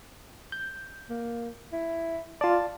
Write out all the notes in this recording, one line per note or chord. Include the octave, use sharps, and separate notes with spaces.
G6
A#3
E4
F4 D5 A5